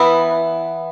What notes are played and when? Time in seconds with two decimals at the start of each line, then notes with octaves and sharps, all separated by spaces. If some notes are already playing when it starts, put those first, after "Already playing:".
Already playing: E3 B3 E4 B4